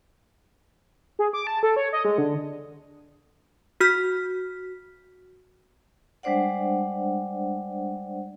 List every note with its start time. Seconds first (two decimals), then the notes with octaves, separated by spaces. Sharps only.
1.19 G#4
1.33 D6
1.47 A5
1.63 A4
1.76 C#5
1.93 D#5
2.05 G#3
2.18 D3
3.81 F#4 F6 B6
6.23 G3 G#3 D4 C5 D5 F#5